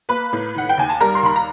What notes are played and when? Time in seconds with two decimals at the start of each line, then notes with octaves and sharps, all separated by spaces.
0.09 A#3 B4 B5
0.33 A2
0.55 D#3 F#5
0.69 G5
0.78 D#2 G#5
0.89 A5
1.01 G3 A#4 A#5
1.15 C6
1.23 D#2 B5
1.36 A#5